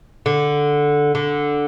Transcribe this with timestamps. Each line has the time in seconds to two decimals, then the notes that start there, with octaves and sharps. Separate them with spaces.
0.26 D3
1.15 D3